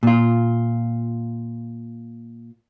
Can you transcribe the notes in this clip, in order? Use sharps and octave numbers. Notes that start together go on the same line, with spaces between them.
A#2 F4